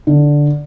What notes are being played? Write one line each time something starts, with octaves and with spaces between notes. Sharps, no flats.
D3